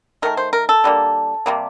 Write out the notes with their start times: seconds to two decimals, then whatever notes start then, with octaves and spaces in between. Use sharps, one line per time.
0.22 D#3 A3 A#4
0.37 C5
0.53 A#4
0.69 A4
0.84 D3 G3 A#3
1.46 C3 G3 A#3